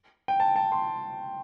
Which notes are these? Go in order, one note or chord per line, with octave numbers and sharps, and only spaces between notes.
G5
A5
A5
C6